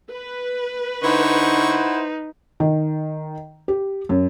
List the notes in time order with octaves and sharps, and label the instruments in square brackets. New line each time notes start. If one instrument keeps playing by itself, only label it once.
[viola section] B4
[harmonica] D3 C#6 [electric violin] D#4 [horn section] E4 C5 F#5
[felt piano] D#3
G4
F#2